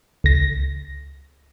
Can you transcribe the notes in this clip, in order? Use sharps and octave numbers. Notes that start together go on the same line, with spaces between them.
C#2 A#6